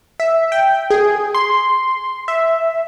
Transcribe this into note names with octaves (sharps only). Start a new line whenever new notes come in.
E5
G5
G#4
C6
E5